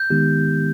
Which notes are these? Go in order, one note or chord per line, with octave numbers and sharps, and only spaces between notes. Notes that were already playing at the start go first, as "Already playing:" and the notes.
Already playing: G6
D#3 G#3 B3 D#4 G4